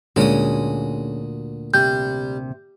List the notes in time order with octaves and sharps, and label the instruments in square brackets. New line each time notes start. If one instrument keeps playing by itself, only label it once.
[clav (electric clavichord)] D2 A#2 [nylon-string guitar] G#3 C#4 [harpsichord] F#4 D#6
[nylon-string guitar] C3 [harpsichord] G3 [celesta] G6